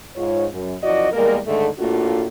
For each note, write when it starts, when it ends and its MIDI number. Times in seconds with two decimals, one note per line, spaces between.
0.16 0.45 44
0.16 0.45 65
0.16 0.45 73
0.53 0.74 42
0.83 1.07 42
0.83 1.07 53
0.83 1.07 64
0.83 1.07 66
0.83 1.07 74
0.83 1.07 75
1.12 1.39 40
1.12 1.39 55
1.12 1.39 56
1.12 1.39 58
1.12 1.39 70
1.46 1.68 44
1.46 1.68 50
1.46 1.68 51
1.46 1.68 56
1.46 1.68 57
1.79 2.27 45
1.79 2.27 57
1.79 2.27 58
1.79 2.27 62
1.79 2.27 65
1.79 2.27 66